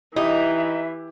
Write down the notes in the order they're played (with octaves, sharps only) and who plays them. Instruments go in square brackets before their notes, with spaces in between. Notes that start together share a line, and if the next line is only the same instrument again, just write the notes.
[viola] E3 [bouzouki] D#4 [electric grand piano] E4 G4 [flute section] E5